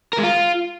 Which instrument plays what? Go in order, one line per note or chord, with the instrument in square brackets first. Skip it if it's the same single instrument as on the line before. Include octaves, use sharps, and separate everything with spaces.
[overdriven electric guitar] A#4
G#3
F4